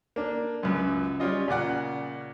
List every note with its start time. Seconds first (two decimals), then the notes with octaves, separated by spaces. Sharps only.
0.16 A#3 D4
0.63 C#2 F#2
1.20 G3 C#4 F4 D#5
1.48 A#2 C#3 D5 F#5